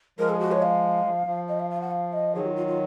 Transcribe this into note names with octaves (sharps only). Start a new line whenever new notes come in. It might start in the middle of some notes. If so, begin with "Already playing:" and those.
F3 G#3 A#4
G#4
F#4
C#5
F5
F3
F3
D#5
F5
F5
F#5
F5
D#5
D#3 F#3 G#4
F4
F4
F4